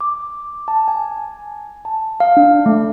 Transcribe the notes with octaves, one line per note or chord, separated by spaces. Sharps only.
D6
A5
G#5
A5
F5
D4
A3